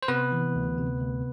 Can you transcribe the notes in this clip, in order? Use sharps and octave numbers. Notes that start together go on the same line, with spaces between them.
C5
C3 B3 B4
E3
D2
C3
D2